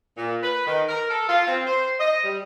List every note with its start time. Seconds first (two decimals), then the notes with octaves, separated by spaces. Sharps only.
0.17 A#2
0.43 B4
0.66 D#3
0.88 A#4
1.10 A4
1.28 F4
1.46 C4
1.66 C5
1.99 D#5
2.24 G3